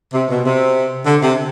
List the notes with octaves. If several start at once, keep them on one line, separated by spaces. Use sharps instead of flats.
C3
B2
C3
D3
C3